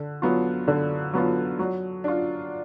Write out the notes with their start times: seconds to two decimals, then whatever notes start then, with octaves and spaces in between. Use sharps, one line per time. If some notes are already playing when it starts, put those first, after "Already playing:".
Already playing: D3
0.22 F#3 B3 F4
0.68 D3
1.13 F#3 B3 F4
1.59 F#3
2.04 D4 F4